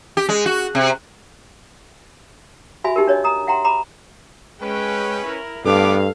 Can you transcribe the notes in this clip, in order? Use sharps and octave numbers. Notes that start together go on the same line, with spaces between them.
G4
G#3
F#4
C3
F#4 E5 G#5 B5
D#4 G4 A#4
D4 C#5 D#5
A#5 D#6
E5 F#5 G5 A#5 C6
A#5 B5 D6
G#3 C#4 B4 G5
E4 A#4
G2 B3 A4 F5 D6